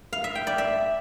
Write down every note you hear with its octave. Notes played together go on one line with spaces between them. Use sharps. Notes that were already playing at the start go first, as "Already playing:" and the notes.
F5
E5
G5
D5
E5